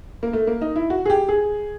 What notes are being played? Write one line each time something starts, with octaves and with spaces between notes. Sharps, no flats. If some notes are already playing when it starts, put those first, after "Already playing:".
A#3
A3
A#3
D#4
E4
F#4
G#4
G4
G#4